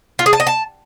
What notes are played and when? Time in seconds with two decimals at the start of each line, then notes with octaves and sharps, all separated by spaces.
0.19 F4
0.26 G#4
0.33 A5
0.40 D#5
0.47 A5